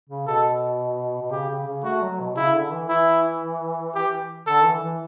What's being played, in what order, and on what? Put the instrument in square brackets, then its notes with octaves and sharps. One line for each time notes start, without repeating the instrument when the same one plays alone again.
[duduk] C#3
[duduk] B2 [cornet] A4
[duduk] B2
[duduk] C#3 [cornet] G4
[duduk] C#3
C#3
[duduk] A3 [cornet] F#4
[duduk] F#3
B2
[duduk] C#3 [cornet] E4
[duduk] D3
E3
[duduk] E3 [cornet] E4
[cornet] G4
[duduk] D3 [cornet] A4
[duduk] E3
E3